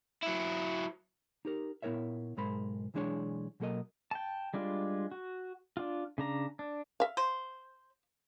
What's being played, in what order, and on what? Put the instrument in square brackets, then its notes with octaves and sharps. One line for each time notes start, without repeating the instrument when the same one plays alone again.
[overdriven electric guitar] F#3 E4
[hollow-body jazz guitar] D#4 G4 A#4
A#2 B3 E4 A#4 C#5 E5
B1 G#2 G#3 A#4 C5 B5
B1 E3 G#3 D4 G#4 C#5
B2 F#3 A#3 A4 A#4 D#5
[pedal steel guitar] G5 A5
G3 G#3 D4 F4
F#4
D4 F4
C#3 D4 A#5
D4
[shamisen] E5 F5
[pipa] C5